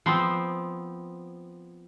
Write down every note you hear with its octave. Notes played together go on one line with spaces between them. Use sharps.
F3 B3 C4